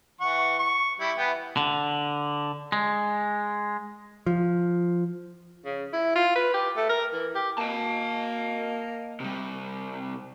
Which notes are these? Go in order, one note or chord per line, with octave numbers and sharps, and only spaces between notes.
E3 F#5 C#6
C#6
G3 E4
E3 B3 G5
D3
G#3
F3
C#3
E4
F4
B4
G4
A3
A#4
E3
G4
A#3 D#5 A5
C3 G3